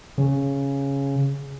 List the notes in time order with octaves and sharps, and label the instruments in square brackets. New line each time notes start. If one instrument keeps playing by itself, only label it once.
[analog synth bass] C#3